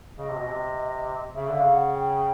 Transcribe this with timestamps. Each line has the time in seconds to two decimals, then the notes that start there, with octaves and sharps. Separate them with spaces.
0.18 C#3 D#5
0.30 C3
0.39 B2
0.51 C3
1.35 C#3 E5
1.49 D3
1.55 F5
1.61 C#3
1.74 F#5
1.94 G5